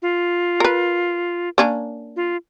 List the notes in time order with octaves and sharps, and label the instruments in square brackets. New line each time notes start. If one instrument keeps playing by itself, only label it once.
[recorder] F4
[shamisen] A#4 B4
A#3 C#4 D4
[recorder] F4